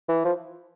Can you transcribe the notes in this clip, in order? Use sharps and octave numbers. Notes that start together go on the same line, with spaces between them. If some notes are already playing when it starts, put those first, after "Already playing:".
E3
F3